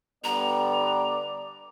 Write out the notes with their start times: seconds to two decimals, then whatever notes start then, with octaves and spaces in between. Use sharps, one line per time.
0.24 D3 G3 B3 D5 A#5